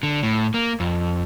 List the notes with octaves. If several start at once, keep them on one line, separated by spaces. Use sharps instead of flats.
D3
A2
A#3
F2